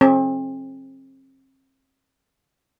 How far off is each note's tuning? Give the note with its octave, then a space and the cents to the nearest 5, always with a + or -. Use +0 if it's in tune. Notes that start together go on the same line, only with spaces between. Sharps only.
C4 +40 G#4 +45